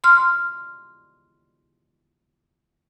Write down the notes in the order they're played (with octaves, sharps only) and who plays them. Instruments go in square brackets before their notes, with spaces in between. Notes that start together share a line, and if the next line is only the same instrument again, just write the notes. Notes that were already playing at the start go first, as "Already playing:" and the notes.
[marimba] C6 F6